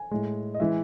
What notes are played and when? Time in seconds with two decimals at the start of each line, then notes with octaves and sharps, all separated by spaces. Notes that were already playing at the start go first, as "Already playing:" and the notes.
Already playing: G#5
0.11 A2 G#3
0.54 D#5
0.60 E3 G#3 E5